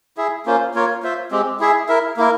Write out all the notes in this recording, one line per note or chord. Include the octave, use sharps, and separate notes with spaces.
E4 G#4 E5
A#3 C#4 F4 C5
A#3 F4 A#4 C#5
F4 C5 E5
G#3 C4 G4
E4 G#4 E5
E4 A#4 E5
A#3 E4 A#4